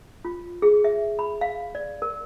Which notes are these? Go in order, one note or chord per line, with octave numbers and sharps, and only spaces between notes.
F4
G#4
E5
B5
F5
D5
A#4